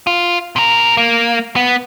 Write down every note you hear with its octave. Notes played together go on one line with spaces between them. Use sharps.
F4
C3 A#4
A#3
B3